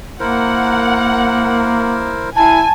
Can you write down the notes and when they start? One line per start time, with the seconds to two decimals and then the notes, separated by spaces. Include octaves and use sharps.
0.20 A#3 E4 A#4 C5 F#5
2.36 E4 G#5 A5